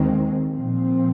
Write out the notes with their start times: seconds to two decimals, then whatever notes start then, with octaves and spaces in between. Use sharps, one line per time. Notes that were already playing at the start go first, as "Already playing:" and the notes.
Already playing: D#2 D#3 G#3 C4
0.55 A#2 F3 C4